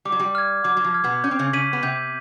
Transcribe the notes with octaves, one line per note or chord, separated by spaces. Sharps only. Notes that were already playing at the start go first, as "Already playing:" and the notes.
G3 D6
F#3
G3
F6 G#6
F#3 D6
F#3
F3
F6 G#6
B2 B3
C#4 G6
C4
C#3 C#4
C#3 C#4 B6 D#7 F#7
B3
C3 C4 G6